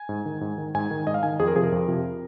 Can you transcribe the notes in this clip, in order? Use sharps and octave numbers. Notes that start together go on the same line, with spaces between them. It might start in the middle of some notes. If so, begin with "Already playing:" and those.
Already playing: G#5
G#2
D#3
G#2
D#3
G#2 G#5
D#3
G#2 D#5
F5
D#3 G#5
F2 G#4
A#4
C3 F3 G#4
A#4
F2
C3 F3